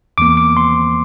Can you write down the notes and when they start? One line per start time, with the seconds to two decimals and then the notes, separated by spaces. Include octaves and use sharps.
0.18 E2 E3 A#3 D6
0.37 D6
0.57 C6